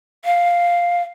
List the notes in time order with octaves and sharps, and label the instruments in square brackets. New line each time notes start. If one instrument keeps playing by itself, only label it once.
[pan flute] F5